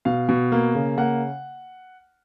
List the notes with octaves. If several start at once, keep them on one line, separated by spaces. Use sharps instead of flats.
B2 F5
B2
A#3
C#3
A#3 F#5